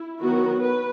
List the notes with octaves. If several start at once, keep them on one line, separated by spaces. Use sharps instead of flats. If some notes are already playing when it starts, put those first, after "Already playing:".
Already playing: E4
D#3 F#3 B3 F#4
B4